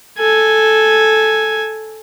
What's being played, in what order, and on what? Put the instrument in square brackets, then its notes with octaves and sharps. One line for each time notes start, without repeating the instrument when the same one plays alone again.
[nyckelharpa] A4 G#5